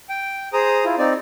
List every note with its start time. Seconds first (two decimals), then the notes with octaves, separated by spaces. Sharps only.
0.09 G5
0.53 G#4 C5 A#5 D#6
0.85 E4 F4
0.98 C4 D#4 D5